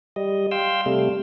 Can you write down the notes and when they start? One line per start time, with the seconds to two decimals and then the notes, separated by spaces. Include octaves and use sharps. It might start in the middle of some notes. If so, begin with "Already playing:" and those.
0.16 G3 D#5
0.51 F5 G5 C6 E6
0.86 C3 G3 A3